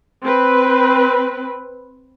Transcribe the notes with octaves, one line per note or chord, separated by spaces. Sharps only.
C4 B4